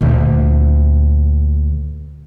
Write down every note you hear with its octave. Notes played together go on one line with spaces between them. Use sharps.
D2 A#2